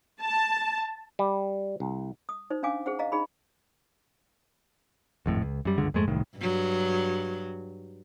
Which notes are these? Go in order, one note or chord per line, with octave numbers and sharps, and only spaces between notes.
A5
G3
C2
D#6
D#4 C5
C#4 D4 F5 G#5 D6
G#4 C5 F#5
D#5 F5 A#5
D#4 G#4 B5
G#1 F2 A2
C#2
F#2 G3
G1 C#2 D3 G#3
F2 G#2 G#3 A3
E1 C2 A2 D#3
G2 F#3